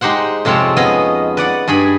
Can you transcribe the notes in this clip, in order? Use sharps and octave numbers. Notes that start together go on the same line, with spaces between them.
G#3 D#4 G4 C5 F#5
F2 C3 G#3 C4 C#5 A5
B3 C#4 G#4 D#5
B4 D5 F#5
G2 G#4 G#5 B5